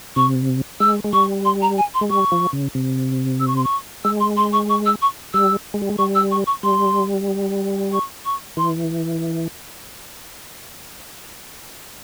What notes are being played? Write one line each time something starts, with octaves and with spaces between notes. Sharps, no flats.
C3 C#6
G#3 E6
G#3
G3 C#6
C6
A#5
G#5
C6
G#3
G3 C#6
F3
C#3
C3
E6
C#6
C6
C#6
G#3 E6
C6
C6
C#6
C#6
E6
C#6
G3 E6
G#3
G3
G#3
G3 C#6
E6
C#6
C#6
G3 C6
C#6
C#6
E3 C6